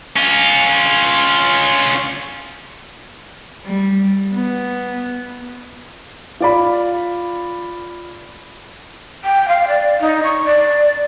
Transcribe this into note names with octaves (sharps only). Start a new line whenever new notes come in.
C#4 F4
G3
B3
F4 D5 B5
G5
F5
D5
D#4
C#6
D5